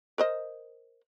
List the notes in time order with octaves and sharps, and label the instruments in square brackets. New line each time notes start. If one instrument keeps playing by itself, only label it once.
[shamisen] A#4 C5 D#5